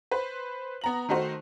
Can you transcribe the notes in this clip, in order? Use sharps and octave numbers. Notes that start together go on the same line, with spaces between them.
B4 C5
B3 A#5 F#7
D#3 A3 D#4 F#4 C5